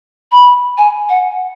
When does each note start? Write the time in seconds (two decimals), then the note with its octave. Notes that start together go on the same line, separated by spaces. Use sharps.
0.32 B5
0.78 G#5
1.10 F#5